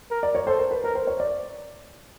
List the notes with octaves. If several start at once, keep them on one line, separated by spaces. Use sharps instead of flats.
A#4
D5
C#5
A4 C5
A#4
B4
A#4 B4
C5
C#5
D5